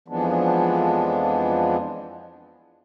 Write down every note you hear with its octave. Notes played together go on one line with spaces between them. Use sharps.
F2 E3 F3 G#3 B3 D4